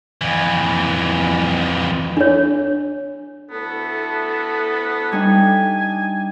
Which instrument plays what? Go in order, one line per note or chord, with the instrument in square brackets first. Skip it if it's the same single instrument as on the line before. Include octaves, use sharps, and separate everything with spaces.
[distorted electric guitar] F2 E3
[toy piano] D4 C#5
[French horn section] D2 E4 A4 [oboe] B3
[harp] G3 D4 D#4 [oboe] G#5